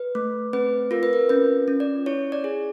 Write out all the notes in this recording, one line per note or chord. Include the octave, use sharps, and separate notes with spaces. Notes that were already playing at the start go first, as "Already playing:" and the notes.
Already playing: B4
A3
C4 B4
F4 A#4
B4
A#4
C#4 B4
C#4
D5
E4 C#5
D5
G#4